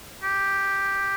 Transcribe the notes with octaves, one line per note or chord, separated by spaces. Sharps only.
G4